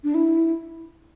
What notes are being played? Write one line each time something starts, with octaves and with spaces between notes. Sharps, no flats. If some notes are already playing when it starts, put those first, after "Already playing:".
D4
E4